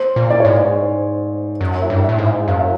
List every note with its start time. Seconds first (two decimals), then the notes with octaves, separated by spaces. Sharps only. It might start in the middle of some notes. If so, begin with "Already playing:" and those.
Already playing: C5
0.16 A#2
0.30 D5
0.40 G#2 C#5
0.50 D5
1.61 F#2
1.82 E5
1.90 G2
2.04 A2 E5
2.18 G#2
2.26 E5
2.48 F#2 F5
2.59 E5